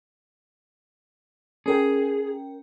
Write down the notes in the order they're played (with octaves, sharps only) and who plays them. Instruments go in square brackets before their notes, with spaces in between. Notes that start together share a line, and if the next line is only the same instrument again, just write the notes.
[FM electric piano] C#4 A#4 G5 [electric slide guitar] G#4